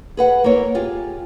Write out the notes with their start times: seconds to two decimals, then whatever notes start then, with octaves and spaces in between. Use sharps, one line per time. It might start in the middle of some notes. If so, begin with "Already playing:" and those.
0.17 G#4 B4 F#5
0.44 A#3 B3 E4 C#5
0.75 F4 G4 G#4